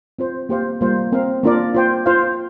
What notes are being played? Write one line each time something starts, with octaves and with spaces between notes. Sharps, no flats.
C4 F4 C5
A#3 G4 C5 F5
G3 A#3 F4 C5 F5
C4 A#4 F5
A#3 D4 F4 A#4 D5
F4 C5 G5
F4 C5 F5